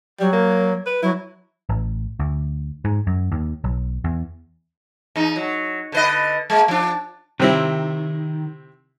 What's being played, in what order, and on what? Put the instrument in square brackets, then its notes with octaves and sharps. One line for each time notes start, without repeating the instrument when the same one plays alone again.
[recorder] F#3 [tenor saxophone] G3
[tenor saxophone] A#3
B4
[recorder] F#3 [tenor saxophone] E4
[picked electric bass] A1
D2
G#2
F#2
D#2
B1
E2
[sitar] E2 D#4
F#3
D3 B4 D#5
G#3 A#3
F3 D4
[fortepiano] C3 C4 E4 [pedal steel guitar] D#3